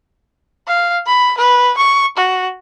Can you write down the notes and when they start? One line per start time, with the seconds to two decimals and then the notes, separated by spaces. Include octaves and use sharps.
0.68 F5
1.06 B5
1.38 B4
1.77 C#6
2.17 F#4